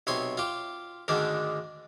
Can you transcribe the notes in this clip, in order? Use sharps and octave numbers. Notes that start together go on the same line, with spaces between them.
B1 C3 C#5 C6
F4 G4
D2 G#2 D3 D#3 D4